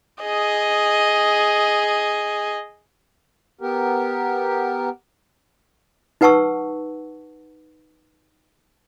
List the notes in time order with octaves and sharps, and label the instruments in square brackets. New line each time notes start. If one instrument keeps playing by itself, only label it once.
[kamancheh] G#4 D#5
[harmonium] B3 G4 A#4
[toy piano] D#4 B4 F#5 A5 C#6 E6